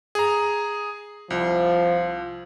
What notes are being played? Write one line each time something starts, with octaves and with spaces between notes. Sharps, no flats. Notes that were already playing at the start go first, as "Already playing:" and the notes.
G#4 A#5
C2 F3